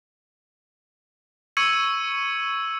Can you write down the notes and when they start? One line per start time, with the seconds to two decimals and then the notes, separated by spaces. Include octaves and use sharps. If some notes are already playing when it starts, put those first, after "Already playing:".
1.57 C#6 E6 G#6 C#7 D#7 F#7